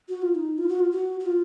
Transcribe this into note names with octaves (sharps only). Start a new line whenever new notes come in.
F#4
F4
D#4
F4
F#4
F4
F#4
F#4
F4